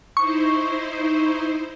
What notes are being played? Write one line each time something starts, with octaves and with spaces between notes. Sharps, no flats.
D#4 E4 C5 C#6